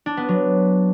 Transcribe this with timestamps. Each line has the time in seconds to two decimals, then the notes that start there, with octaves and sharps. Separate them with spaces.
0.06 D4
0.17 B3
0.29 F#3